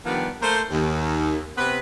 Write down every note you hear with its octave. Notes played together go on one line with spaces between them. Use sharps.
D#3 F3 G3 B3 D4
A3 A#3 A#4 C5
D#2
C3 B3 C4 B4